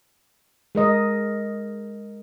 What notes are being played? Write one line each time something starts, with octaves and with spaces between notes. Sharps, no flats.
G#3 A#4 D#5